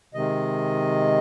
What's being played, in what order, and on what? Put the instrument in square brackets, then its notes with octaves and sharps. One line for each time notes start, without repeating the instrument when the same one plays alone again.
[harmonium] C3 D#3 G#3 D#5